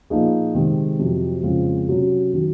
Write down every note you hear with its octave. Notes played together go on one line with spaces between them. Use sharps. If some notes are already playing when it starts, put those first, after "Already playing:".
A#2 F3 A#3 D#4 G#4
C3 D#3 G#3 C4
F2 C3 F#3
F2 C#3 G#3 C4 F4
C3 F#3 C#4
D#3 F#3